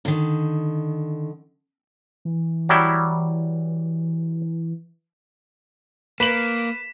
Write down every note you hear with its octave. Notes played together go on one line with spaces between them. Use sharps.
D3 D#3
E3
F#3 G3 E4
A#3 B4 B6 E7 F#7